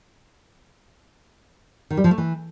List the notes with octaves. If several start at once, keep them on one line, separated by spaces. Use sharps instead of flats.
D#3
G3
F3
A3
E3